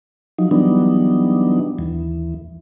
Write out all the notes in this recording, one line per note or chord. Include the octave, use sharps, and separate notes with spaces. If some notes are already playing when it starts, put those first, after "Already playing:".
F3 F#3 D#4
E3 F#3 G3 B3 D4 D#4
D#2 E3